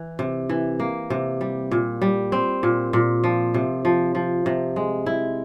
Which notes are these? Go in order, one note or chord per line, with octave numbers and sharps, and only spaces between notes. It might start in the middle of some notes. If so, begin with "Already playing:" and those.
Already playing: E3
C3
E3
A#3
C3
G3
A#2
G3
C4
A#2
A#2
F3
C3
F3
F3
C3
G#3
E4